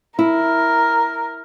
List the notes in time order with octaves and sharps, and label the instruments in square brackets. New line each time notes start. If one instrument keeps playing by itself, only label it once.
[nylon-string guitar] E4 [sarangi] A#4